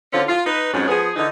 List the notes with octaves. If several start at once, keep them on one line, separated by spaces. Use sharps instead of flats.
D3 C4 C#4 F4
F4
D#4 B4
F2 G#2 F#3 C#4
F3 B3 G#4
D3 E3 D#4